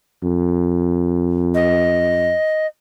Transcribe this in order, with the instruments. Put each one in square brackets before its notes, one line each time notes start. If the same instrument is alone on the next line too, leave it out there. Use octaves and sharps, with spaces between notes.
[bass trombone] F2
[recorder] D#5